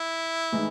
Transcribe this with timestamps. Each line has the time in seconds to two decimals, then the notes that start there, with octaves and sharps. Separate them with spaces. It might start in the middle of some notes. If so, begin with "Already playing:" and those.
Already playing: E4
0.52 A2 E3 G#3 D#4